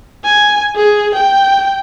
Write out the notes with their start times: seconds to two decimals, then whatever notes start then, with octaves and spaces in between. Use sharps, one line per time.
0.24 G#5
0.76 G#4
1.14 G5